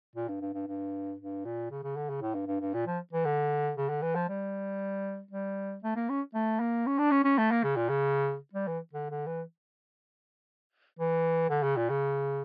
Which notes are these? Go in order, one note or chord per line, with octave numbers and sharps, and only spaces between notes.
A#2
G2
G2
G2
G2
G2
A#2
C#3
C#3
D3
C#3
A2
G2
G2
G2
A#2
F3
E3
D3
C#3
D3
E3
F3
G3
G3
A3
A#3
C#4
A3
A#3
C#4
D4
C#4
C#4
A3
A#3
C#3
A#2
C#3
G3
E3
D3
D3
E3
E3
D3
C#3
A#2
C#3